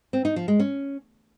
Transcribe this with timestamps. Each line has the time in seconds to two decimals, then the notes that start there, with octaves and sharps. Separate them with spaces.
0.13 C4
0.25 D#4
0.36 F3
0.48 G#3
0.60 C#4